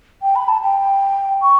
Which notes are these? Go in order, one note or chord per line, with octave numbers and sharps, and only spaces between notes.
G5
B5
A5
G5
C#6